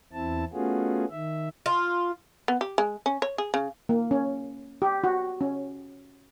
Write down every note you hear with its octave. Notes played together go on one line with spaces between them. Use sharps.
E2 C4 E4 A5
A3 B3 C#4 F4 F#4 G#4
D#3 E5
F4
B3
G4
G#3
C#4
C#5
G#4
C#3
A#3
C#4
G4
F#4
C#4